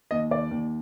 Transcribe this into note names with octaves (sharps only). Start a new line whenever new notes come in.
D#2 D#5
D#2 D5
D#2